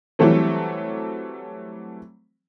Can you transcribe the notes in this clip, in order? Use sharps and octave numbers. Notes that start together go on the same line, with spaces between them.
E3 F#3 G3 A3 C4